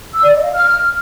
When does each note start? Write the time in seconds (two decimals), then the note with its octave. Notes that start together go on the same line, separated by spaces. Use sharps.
0.14 E6
0.24 D5
0.33 D#5
0.43 F5
0.53 F6